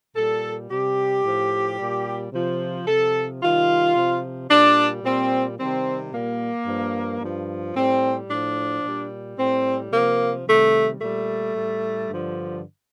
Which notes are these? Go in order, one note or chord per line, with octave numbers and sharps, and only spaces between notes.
A#2 G3 A4
C3 G3 G4
A2 F3
A#2 G3
C3 F3
C3 F3 A4
C3 D#3 G3 F4
C3 F3
A#2 G3 D4
A#2 G3 C4
C3 D#3 G3 C4
A#2 G3 A#3
G2 F3
G2 F3
A2 G3 C4
A2 F3 D4
A#2
G3
A2 G3 C4
C3 F3 A#3
C3 D#3 G3 A3
A#2 G3 A3
A2 G3
G2 D3 F3